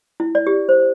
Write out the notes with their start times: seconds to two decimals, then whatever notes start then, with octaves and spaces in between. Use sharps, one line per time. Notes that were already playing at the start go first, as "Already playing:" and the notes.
0.20 E4
0.35 D5
0.47 G4
0.69 C5